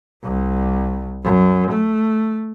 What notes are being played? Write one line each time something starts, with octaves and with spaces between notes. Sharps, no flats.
C2
F#2
A3